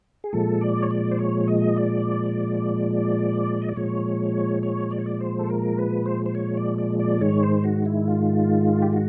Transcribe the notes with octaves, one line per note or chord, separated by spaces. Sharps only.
G#4
A#2 F3 G#3 A4
D5
C#5
D5
C5
C#5
D#5
D5
D#5
D5
A#2 F3 G#3 C#5
C#5
D5
C#5
D5
C5
A4
A#4
B4
C5
C5
C#5
D5
D5
D5
G#2 D#3 G#3 C#5
C5
F#4
E4
F4
G4
F#4